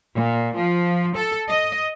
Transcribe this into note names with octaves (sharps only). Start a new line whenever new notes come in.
A#2
F3
A4
D#5